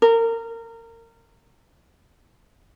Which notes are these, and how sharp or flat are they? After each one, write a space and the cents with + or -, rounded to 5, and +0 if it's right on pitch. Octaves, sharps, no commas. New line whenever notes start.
A#4 -25